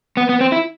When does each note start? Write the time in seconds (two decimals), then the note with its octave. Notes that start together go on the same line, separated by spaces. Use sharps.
0.17 B3
0.29 B3
0.41 C4
0.52 E4